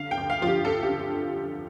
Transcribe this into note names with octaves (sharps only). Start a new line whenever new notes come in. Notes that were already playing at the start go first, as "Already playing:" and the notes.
Already playing: D3 F5
G5
D2
F5
F3 F4
G4
D2 A4
G4
D3